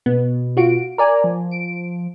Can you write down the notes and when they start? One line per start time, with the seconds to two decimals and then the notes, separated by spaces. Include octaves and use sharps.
0.06 B2 B3
0.57 F4 F#4 D7
0.98 A#4 D5 G#5 A#5
1.24 F3
1.51 D7